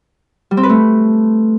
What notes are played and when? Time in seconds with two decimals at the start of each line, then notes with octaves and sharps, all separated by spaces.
0.51 G3
0.57 C4
0.63 B4
0.70 A3